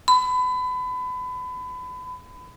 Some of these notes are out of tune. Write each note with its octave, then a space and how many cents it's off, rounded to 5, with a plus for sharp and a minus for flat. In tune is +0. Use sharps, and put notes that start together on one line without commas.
B5 +30